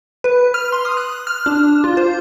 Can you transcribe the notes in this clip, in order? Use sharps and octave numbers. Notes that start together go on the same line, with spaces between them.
B4
F6
C6
D#6
F#6
F6
D4
F4
C5